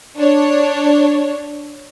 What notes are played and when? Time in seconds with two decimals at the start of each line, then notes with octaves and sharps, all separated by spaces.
0.17 D4 C#5